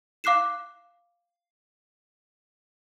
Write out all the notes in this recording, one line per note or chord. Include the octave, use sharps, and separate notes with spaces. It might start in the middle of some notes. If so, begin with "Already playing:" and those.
F5 D6 F#6 C7 E7